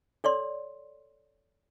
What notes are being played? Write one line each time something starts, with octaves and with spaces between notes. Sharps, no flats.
A4 C#5 D5 C6